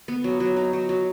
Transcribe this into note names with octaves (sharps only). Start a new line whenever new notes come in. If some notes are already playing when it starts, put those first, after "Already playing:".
B3
F#3
F#3
D#4
F#3
F#3